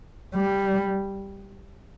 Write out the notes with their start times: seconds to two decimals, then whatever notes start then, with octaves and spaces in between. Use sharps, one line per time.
0.35 G3